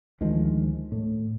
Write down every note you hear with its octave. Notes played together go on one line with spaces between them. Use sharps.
D2 D#3 F3 G#3
A2